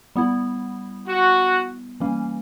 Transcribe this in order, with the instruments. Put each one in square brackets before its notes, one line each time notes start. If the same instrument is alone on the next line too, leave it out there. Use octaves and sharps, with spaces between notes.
[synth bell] G3 B3 E4
[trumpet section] F#4
[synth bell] E3 G3 A#3 C#4